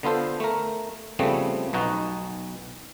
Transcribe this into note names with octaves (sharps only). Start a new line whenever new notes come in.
D3 B3 F4 A4 C5
A3 A#4
C#3 F3 G3 A3 B3 C4
B1 B2 D#4 F#4